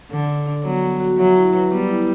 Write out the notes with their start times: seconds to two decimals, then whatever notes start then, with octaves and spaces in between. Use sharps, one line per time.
0.11 D3 A4
0.29 A4
0.46 D4
0.65 F#3 B3
0.83 G3
1.00 F#4
1.18 F#3 E5
1.36 E4
1.53 B4
1.71 G3 B3
1.89 E4